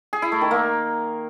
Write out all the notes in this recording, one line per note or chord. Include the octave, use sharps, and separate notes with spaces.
G#4
E4
A3
D#3
A#3